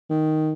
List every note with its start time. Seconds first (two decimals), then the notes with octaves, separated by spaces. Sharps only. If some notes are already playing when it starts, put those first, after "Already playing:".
0.10 D#3